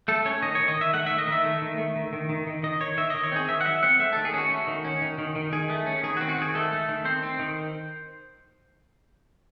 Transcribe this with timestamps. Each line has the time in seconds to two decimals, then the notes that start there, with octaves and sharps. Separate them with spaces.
0.08 A3 A4
0.26 C#4 C#5
0.42 D#3 D#5
0.55 D#3 C#5
0.68 D#5
0.77 D#3 E5
0.94 A3 F#5
1.06 D#3 E5
1.18 D#5
1.28 D#3 E5
1.44 A3
1.62 D#3
1.78 A3
1.96 D#3
2.13 D#3
2.29 D#3
2.47 D#3
2.63 D#3 D#5
2.80 D#3 C#5
2.97 D#3 E5
3.10 D#3 D#5
3.24 C#5
3.32 C4 G#4
3.48 D#3 E5
3.61 F#5
3.65 F#3 E5
3.83 C4 F#5
3.99 A3 E5
4.13 D#3 A4
4.25 G#4
4.34 C#4 F#4
4.50 A3
4.67 D#3
4.85 C#4
5.02 D#3
5.18 D#3
5.36 D#3
5.52 D#3 G#4
5.70 A3
5.87 C#4
6.03 D#3 G#4
6.17 F#4
6.21 C4
6.29 F#4
6.37 D#3 G#4
6.55 A3 A4
6.72 A3
6.88 D#3
7.05 C4 C5
7.23 C4
7.39 D#3